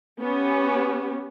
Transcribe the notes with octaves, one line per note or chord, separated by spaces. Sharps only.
B3 C#4 G4